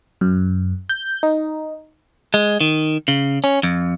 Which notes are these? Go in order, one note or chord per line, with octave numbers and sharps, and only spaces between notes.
F#2
G6
D#4
G#3
D#3
C#3
C#4
F2